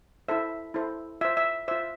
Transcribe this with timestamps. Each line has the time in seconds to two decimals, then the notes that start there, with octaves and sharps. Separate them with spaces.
0.28 E4 A4 C5 E5
0.74 E4 A4 C5
1.21 F4 C5 E5
1.37 E5
1.68 F4 C5 E5